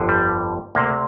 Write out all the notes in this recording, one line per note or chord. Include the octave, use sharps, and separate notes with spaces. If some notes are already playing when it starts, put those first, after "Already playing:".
Already playing: G1 F2 D3
G3
D2 C3 A#3